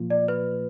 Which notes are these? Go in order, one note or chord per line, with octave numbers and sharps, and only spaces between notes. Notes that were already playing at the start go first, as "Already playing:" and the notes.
Already playing: A#2 F3 A#3 F4
D5
B4